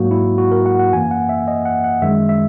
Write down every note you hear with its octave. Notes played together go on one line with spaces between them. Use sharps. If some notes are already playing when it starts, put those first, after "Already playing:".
Already playing: G#2 F#3 A#3 F#4
E4
F#4
A#4
F#5
F#5
F#2 E3 A#3 G#5
F#5
E5
D#5
F#5
F#5
F#2 D#3 G#3 E5
E5